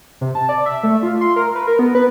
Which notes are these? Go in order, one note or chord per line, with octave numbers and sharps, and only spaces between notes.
C3
A5
D5
E5
A3
F4
C6
A#4
B4
A#4
B3
B4